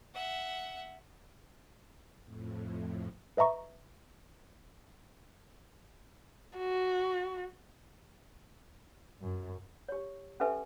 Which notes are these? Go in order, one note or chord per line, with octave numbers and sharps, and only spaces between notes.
E5 F#5
F2 A2
B4 D#5 E5 A#5 C#6
F#4
F#2
G4 C#5
C#4 G4 A4 B4 E5 G#5